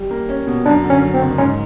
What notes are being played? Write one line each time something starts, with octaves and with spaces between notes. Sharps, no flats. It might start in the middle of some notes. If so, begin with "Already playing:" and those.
Already playing: G3
A#3
C#4
B2
F#2 D4
D3
C#4
F#3
C4
F#1
G#2 C#4